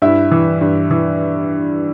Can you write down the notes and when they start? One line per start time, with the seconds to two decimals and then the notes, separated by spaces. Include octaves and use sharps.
0.02 G2 E4 E5
0.31 E3
0.61 G2
0.91 E3